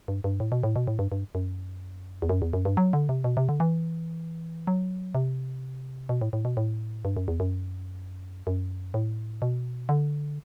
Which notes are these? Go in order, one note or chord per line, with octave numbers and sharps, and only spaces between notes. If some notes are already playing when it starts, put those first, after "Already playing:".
G2
G2
A2
B2
A2
B2
A2
G2
G2
F#2
E2
F#2
E2
F#2
G2
F#3
D3
C3
B2
C3
D3
E3
F#3
C3
B2
A2
A2
B2
A2
G2
F#2
E2
F#2
F#2
A2
B2
D3